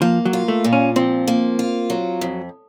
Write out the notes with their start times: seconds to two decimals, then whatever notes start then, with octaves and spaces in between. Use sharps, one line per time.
0.02 F3 A#3
0.25 F#3
0.33 F4
0.48 A3
0.64 A#2
0.73 C#4
0.96 F3 C4
1.28 A#3
1.59 F4
1.90 F#3
2.21 F2